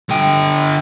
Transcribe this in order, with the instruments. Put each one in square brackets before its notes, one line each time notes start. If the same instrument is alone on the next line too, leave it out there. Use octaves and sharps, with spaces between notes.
[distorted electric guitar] D3 G5